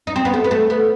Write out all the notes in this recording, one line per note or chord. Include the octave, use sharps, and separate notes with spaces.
D#4
C4
B3
A3
B3
A3
B3